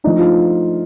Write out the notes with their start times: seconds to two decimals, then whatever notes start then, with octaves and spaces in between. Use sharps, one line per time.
0.04 F3 A3 D4 D#4
0.19 F4